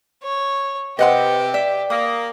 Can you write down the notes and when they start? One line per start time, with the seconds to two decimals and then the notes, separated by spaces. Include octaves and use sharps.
0.23 C#5
0.99 C3 G4 B4 D#5 F#5 C6
1.54 D5 E5
1.90 A#3 D#6